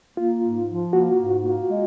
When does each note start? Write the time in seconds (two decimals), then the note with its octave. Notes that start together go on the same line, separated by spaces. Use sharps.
0.17 A#3 F4
0.42 G#2
0.67 F3
0.93 A#3 F#4
1.18 G#2
1.44 A#3
1.69 G#3